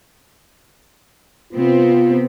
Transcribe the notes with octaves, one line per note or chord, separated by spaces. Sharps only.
C3 B3 C4 F4